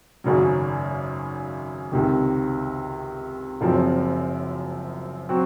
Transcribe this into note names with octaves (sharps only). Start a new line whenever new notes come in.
G#1 F#2 C#3 F#3
C#2 C3 D#3
F#1 F#2 F3 C4
F#3 C4 F#4